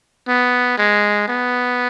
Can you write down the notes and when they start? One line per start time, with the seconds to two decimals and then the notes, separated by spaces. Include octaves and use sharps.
0.28 B3
0.78 G#3
1.28 B3